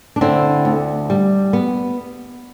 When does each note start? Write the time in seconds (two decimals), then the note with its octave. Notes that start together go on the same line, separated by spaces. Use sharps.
0.16 D4
0.21 D3 C4 E4
0.65 D2
1.10 G3
1.53 B3